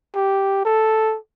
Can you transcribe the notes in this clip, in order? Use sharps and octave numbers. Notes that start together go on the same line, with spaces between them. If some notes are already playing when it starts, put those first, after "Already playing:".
G4
A4